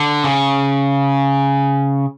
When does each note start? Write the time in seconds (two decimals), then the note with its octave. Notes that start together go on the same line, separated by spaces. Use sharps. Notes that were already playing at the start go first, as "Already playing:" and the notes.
Already playing: D3
0.24 C#3